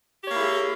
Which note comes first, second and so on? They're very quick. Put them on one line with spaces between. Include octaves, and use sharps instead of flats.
G4 C#5 A#3 E4 G#4